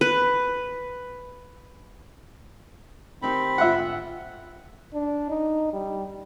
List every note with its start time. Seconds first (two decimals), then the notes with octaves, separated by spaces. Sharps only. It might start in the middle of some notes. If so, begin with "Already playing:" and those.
0.01 B4
3.22 D#3 C4 D#4 G4 B5
3.58 G#2 D3 F4 E5 F#5
4.94 D4
5.30 D#4
5.73 G3